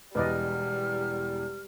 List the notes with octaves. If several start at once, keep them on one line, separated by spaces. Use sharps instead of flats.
E1 E2 G3 B4 D5 D#5 F6